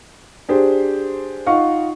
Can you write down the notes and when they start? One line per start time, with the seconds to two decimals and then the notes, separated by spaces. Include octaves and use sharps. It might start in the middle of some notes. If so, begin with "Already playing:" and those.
0.49 D4 G4 G#4 C5
1.47 D#4 F4 D#5 F5 F#5 C#6